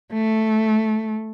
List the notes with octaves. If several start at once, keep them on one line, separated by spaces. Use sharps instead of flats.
A3